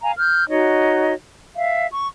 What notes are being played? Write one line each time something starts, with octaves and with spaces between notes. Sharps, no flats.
F5 G#5 A#5
F6 G6
D#4 F#4 C#5 D#5
E5 F5
C#6